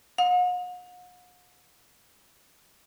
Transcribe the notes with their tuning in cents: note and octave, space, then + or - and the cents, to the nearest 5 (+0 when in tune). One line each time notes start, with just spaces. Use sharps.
F#5 -45